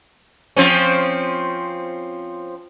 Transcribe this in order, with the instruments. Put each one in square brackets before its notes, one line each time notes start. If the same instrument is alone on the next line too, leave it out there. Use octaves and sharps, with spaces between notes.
[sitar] F3 C4 C#4